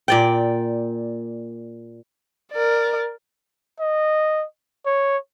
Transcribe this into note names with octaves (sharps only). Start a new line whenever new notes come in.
A#2 D5 G5
A#4 D5
D#5
C#5